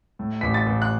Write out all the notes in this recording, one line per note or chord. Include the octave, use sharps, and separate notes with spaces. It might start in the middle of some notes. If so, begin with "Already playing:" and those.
A2
A1 B6
A6
A1
F#6